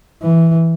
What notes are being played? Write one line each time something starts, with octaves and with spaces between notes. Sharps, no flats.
E3